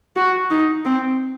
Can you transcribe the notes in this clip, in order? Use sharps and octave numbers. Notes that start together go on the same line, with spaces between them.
F#4
D#4
C4